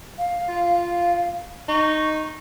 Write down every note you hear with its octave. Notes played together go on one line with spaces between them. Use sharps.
F5
F4
D#4 C#6